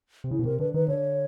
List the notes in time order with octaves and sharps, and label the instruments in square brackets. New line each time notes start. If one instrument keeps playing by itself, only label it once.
[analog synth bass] C3
[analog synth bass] C#3 [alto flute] E4
[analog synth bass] B2
[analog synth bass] C3 [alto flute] A#4
[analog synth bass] D3 [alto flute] B4
[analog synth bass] D#3 [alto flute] B4
[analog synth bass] D3 [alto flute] C#5